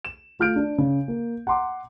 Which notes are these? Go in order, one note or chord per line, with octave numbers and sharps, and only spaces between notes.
E7
A3 F4 F6 G6 D7
D4
C#3
A#3
F#5 A#5 C6 D6